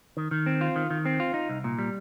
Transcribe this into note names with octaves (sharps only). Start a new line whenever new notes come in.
D#3
D#3
C4
F4
D#3
D#3
C4
F4
D#4
C2
A#2
G3